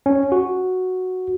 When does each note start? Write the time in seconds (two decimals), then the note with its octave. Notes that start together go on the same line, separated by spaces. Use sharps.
0.06 C#4
0.32 F#4